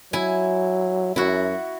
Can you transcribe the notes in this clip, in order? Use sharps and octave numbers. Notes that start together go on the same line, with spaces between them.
F#3 E4 G#5
F#2 E4 F#4